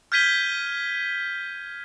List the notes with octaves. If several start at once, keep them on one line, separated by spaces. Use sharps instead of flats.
F6 G6 G#6 B6 D#7 G7